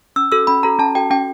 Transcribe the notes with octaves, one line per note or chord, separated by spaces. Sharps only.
C#4 E6
F#4 A4 E6
C#4 B5
F#4 A4 A#5
C#4 A5
F#4 A4 G5
C#4 G5